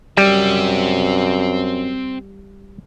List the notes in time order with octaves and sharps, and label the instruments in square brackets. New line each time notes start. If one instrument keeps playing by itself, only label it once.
[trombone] F#2 [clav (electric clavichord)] G3 [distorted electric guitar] C4 E5